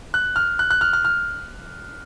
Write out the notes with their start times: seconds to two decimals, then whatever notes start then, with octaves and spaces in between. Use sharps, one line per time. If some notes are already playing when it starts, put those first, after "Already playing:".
0.14 F#6
0.36 F6
0.59 F#6
0.71 F#6
0.81 F6
0.93 F6
1.05 F6